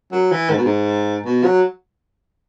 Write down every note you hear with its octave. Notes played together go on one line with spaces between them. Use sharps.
F#3
E3
G#2
B2
G#2
B2
F#3